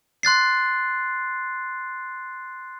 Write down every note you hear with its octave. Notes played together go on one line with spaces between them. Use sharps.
C6 F#6 A6 C7